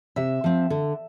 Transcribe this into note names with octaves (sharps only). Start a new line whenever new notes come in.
C3 E5
F3 C4
D3